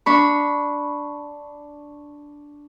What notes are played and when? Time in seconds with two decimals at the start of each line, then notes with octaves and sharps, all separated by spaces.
0.06 D4 B5 C#6